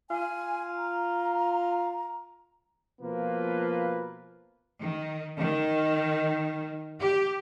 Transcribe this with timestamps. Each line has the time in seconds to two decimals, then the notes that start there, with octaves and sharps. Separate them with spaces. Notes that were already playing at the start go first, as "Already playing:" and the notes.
0.10 F4 G#5
0.77 A#5
3.01 B2 F3 A#3 F4 B4
4.79 D#3
5.39 D#3
7.00 G4